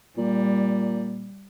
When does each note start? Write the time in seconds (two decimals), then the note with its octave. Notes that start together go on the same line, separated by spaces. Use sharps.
0.17 A#2 G3